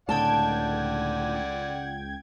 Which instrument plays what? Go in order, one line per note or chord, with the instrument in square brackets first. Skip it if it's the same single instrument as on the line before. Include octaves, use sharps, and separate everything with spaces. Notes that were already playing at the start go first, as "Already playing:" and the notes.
[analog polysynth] C#2 G5 G#6 [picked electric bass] A2 D3 [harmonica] D5 F#5 [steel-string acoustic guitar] A5